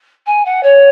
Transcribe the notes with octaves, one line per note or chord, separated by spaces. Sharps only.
G#5
F#5
C#5